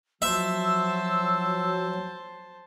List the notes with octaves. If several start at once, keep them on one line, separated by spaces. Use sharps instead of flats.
F3 F#3 F#4 C5 E5 A5 E6